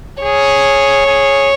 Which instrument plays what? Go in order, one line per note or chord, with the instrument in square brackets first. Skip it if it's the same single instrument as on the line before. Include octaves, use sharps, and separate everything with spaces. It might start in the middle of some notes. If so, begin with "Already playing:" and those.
[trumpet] G#4 [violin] C#5
[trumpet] G#4